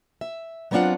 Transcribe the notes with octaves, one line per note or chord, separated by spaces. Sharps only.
E5
F#3 B3 C4 D4 F4 F#5